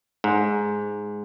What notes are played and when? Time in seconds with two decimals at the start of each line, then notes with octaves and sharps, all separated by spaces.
0.24 G#2